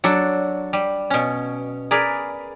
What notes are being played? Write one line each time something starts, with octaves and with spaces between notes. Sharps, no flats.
F#3 D4 F#4 A4 D5
G3
B2 C#4
G#4 A#4 B4 D5